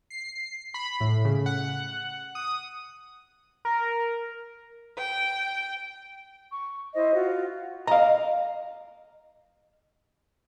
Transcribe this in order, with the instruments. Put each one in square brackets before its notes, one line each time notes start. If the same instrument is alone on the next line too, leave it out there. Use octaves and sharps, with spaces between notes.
[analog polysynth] C7
B5
A2
C#3
F#5
D#6
[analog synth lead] A#4
[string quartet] G5
[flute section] C#6
E4 C5 D#5
F4 F#4
[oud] D#5 [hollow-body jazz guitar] F5 A#5